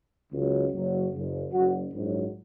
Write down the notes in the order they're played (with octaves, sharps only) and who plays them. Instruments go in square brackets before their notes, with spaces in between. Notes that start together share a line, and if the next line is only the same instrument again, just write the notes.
[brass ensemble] C#2 C#3 F#3
F#1 F#2 F#3
F#1 F#2 C#3
F#1 F#2 F#3 F#4
A#1 G#2 F#3